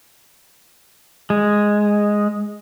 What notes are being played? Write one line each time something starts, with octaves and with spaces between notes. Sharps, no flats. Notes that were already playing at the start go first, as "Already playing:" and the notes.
G#3